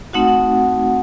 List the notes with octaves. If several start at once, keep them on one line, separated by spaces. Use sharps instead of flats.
A3 C4 D#4 F#4 F#5